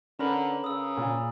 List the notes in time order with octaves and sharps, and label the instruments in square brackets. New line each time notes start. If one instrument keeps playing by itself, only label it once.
[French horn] D3 [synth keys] C#4 A#4 B4 [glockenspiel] A#5 B5 F#7
[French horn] C#3 [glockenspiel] D#6 E6
[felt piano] A#2